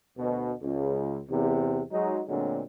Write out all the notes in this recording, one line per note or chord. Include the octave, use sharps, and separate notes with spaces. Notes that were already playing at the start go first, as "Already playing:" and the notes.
D2 B2
C#2
E2 C3
F#3 G#3 D#4
D2 A#2 D3 F#3 G#3 C4